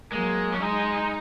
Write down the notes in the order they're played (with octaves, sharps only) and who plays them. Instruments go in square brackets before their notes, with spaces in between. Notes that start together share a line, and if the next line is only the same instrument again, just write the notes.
[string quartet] F#3 A#3 [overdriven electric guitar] G#3
[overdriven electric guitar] C#4
[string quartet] G#3 [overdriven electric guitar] D#4